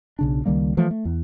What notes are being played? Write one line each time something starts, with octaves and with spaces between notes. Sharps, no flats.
B1 C#3 D4
C#2 D#3 G3 A#3
E3 F3 A3
A3
E2